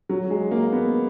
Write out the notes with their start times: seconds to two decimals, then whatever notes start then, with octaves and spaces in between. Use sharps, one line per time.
0.09 F#3
0.30 G#3
0.51 A#3
0.73 B3